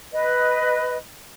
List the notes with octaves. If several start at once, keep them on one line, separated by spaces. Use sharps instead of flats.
B4 D#5